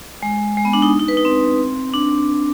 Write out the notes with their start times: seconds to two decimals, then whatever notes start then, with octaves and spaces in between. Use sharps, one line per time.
0.23 G#3
0.57 G#3
0.65 B3
0.73 D4
0.82 D#4
0.99 D#4
1.08 B4
1.17 D#4
1.25 C4
1.94 D4